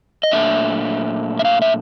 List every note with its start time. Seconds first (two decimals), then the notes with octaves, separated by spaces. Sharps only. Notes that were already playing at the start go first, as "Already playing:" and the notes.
0.23 D#5
0.32 A#2 F#3 A3 D4 E5
1.39 E5
1.45 F5
1.62 E5